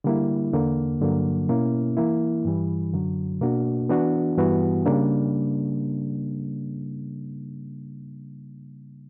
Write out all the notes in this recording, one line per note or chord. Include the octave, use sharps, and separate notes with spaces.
D3 G3 A#3 E4
E2 D3 A#3
G2 D3 F#3 A#3
B2 A#3 C#4 E4
E3 A#3 E4
G2 E3 G3
F#2 D3 F#3
B2 A#3 D4 F#4
E3 B3 D4 F#4
G2 E3 G3 B3 F#4
C#3 G3 A#3 D4